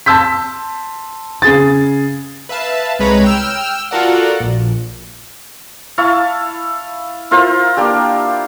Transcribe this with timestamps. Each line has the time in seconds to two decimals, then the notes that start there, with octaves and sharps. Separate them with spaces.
0.06 A5 C6 E6 G6 B6
1.42 C#3 G#4 A6
2.49 B4 E5 F5 A5
2.99 C2 G#3 B4 C#5 A#5 B5
3.24 G5 E6 F6
3.91 F4 F#4 A4 A#4 D5 F#5
4.40 A#1
5.98 E4 F5 A5 C#6
7.31 E4 F4 A#4 C5
7.77 A#3 D4 G4